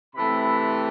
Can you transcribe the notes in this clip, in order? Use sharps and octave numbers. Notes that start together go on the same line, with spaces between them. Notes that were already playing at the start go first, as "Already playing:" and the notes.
C3 E3 A3 C4 B5